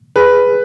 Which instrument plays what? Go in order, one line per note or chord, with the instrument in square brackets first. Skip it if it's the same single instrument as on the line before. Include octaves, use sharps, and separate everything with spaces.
[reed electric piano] G#4 [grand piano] B4